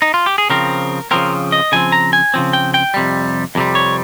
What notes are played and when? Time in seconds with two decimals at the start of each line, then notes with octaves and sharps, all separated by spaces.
0.02 D#4
0.14 F4
0.26 G4
0.38 G#4
0.50 C#3 F3 C4 A#4
1.11 C#3 F3 C4 A#4
1.52 D#5
1.72 C#3 F3 C4 G#5
1.92 A#5
2.13 G#5
2.34 C#3 F3 C4
2.53 G5
2.74 G5
2.94 F2 C3 G3
3.55 F2 C3 G3
3.75 C#5